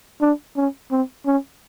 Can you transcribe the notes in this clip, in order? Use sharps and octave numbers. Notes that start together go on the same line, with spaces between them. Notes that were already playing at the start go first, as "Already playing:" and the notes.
D4
C#4
C4
C#4